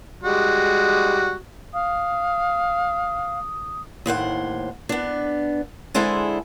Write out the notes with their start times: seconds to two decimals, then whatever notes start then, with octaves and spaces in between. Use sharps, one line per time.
0.24 G3 G#3 F#4
1.74 F5 D#6
4.06 D#2 A2 C5 F#5
4.89 B3 D4
5.94 D3 G#3 E4 G#4 A4 C5